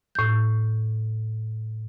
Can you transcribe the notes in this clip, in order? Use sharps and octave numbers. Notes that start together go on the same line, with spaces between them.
A2 G6